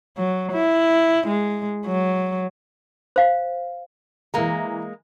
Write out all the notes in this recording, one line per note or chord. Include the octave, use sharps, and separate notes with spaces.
F#3
E4
G#3
F#3
C5 F5
E3 G#3 A#3 A#5